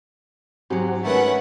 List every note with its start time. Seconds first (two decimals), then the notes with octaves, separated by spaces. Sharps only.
0.70 G#2 F#3 C4 F#4 G4
1.05 D#3 G#3 A3 C#4 B4 F#5